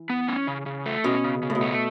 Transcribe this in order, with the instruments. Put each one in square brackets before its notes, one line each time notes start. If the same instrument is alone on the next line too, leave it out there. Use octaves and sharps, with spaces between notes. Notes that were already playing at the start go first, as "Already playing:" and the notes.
Already playing: [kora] E3
[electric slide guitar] B3
C#4
C#3
C#3
A3
[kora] B2 [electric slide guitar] C#4
[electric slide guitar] C#3
C#3
[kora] A2
B2
[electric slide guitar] A3